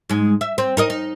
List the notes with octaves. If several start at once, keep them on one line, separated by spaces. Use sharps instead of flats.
G#2 G#3
E5
C4
D#4 A#4 D#5
D#4